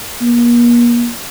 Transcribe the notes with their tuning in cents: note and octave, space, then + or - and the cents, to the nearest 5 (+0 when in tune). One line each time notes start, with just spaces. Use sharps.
A#3 +40